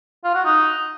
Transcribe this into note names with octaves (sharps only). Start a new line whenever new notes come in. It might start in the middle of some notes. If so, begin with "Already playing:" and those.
F4
F#4
D#4